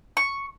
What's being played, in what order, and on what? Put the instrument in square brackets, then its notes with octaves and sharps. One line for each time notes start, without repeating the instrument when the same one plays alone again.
[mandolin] C#6